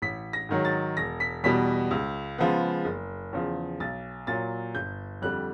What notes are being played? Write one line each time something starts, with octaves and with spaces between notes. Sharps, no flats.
A1 B6
A#6
G#2 D#3 F#3
A6
E1 A#6
B6
E2 B2 G3 B6
C#2
C#3 F3 G#3 B3
F#1
E2 C#3 F3
B1 A6
A#2 F#3 A6
G1 G6
F2 D3 G3 F#6